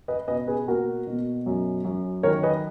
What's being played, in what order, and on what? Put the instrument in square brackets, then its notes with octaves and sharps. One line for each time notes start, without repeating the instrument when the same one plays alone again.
[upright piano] B4 D#5
B2 B4 D#5
G#4 B4
A#3 F#4 A#4
B2
F#2
F#2
D#3 A#4 C#5
B4 D#5